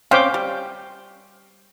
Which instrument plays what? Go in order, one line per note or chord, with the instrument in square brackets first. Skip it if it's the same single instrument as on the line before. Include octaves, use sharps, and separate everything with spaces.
[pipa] C4 C#4 [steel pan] F5 G5 D6
[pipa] G3